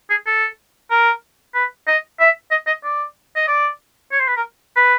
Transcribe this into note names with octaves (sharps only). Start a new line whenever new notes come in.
G#4
A4
A#4
B4
D#5
E5
D#5
D#5
D5
D#5
D5
C#5
C5
B4
A#4
B4